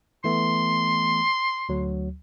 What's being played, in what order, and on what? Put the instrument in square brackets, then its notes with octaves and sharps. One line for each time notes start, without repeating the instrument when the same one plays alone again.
[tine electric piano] E3 A3 B3 [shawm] C6
[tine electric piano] D2 F#3